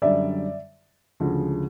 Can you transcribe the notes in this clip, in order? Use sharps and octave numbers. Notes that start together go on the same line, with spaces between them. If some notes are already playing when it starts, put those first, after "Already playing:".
F#2 D3 G3 D5 E5
D2 C#3 F3 G#3